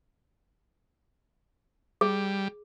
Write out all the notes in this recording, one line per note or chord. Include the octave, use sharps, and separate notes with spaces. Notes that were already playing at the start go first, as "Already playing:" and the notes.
G3 G#4